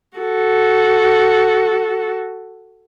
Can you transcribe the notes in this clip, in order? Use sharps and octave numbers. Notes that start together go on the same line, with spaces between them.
F#4 A4